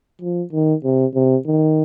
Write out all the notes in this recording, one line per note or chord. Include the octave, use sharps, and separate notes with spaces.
F3
D#3
C3
C3
D#3